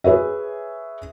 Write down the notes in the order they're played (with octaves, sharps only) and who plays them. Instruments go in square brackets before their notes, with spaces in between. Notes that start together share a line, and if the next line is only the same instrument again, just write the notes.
[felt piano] G#4 B4 C#5 E5